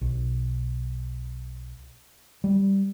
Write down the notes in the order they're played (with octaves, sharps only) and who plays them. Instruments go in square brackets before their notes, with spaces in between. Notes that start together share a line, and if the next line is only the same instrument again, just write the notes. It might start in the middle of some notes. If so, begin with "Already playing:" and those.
[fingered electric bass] B1
G3